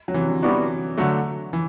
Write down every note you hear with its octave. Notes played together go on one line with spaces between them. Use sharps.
F#3
C3 E3
D3 F#3
E3 G3 B3 D4 F#4
D3 F#3 A3
E3